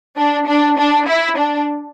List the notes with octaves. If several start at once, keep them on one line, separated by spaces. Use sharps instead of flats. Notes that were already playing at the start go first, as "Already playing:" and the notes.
D4
D4
D4
E4
D4